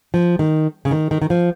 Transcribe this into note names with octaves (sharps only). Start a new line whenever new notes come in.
F3
D#3
C#3
D#3
D#3
D#3
F3